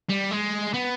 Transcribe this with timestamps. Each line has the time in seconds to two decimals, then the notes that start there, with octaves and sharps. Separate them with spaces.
0.10 G3
0.31 G#3
0.74 B3